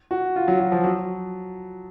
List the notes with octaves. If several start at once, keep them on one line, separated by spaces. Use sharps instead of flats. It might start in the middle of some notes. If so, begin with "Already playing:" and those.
F#4
F4
F#3
F#3
F3
F#3